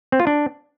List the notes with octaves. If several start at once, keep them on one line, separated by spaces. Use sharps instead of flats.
C4
F4
D4